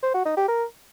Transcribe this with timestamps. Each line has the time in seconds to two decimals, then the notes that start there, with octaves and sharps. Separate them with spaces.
0.02 C5
0.14 F#4
0.25 D#4
0.37 G4
0.48 A#4